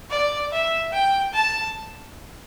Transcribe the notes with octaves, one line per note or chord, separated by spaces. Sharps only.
D5
E5
G5
A5